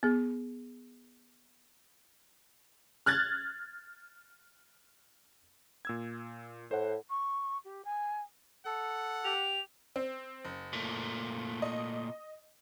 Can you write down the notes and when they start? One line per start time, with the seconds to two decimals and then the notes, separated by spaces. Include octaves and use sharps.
0.03 B3 G#4
3.06 F6 F#6 G#6 A6
5.85 A#2 E6 G#6
6.71 A2 C5 F#5
7.09 C#6
7.64 G4
7.84 G#5
8.66 A4 F#5
9.25 G4 F7
9.96 C4
10.45 F#1
10.73 A#2 A3
11.62 D#5